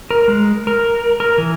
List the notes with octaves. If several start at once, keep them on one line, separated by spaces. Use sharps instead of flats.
A#4
G#3
A#4
A#4
E3